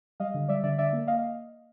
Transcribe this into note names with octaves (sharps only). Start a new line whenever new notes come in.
G3 D#5 F5
D3
G3 D5 E5
D3 D5 E5
D3 D5 E5
A#3
A#3 D#5 F5